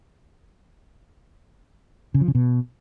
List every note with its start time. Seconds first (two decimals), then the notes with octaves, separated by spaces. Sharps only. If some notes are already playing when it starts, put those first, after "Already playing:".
2.14 C#3
2.21 F3
2.28 C#3
2.35 B2